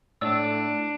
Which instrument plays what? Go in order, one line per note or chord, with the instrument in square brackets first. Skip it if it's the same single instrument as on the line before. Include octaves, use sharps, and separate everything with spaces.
[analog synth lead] A2 [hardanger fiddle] D4 [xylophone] D5 E6